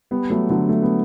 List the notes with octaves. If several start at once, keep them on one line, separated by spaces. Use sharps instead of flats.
G3 B3
F#3 A3
D3 F#3
A3
B3